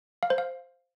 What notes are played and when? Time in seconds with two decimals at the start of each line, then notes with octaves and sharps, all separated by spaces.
0.23 F5
0.30 C5
0.38 F5